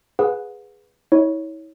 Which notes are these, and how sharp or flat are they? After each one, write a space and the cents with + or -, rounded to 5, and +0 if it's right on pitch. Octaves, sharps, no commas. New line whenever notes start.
G#4 +0 B4 +0 F#5 -35
E4 -40 C#5 +0